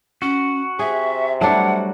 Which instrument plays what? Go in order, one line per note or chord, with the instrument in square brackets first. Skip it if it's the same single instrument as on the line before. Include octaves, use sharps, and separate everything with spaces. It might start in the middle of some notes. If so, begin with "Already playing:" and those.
[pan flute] C#4 [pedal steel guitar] F#4
[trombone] C3 [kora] G#4 [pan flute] E5
[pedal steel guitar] F#3 G3 [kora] A3 D4 E4 [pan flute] F#5